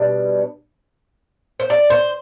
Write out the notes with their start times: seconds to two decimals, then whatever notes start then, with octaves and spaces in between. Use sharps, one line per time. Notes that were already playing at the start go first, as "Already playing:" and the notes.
Already playing: B2 G3 D4
1.60 C5
1.70 D5
1.90 C5